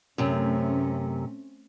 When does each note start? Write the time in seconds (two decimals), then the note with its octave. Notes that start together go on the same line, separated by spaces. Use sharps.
0.18 F#2 C3 A3 C4 C#4